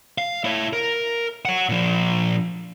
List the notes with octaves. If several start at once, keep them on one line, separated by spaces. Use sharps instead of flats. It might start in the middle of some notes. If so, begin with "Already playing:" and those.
F5
E4 C#5
A#4
C#5 F#5
A#2 F3